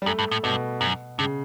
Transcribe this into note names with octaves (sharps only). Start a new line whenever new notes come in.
G3
F#2 A3
G2
A2
G2 B2
F#2
G2 C#3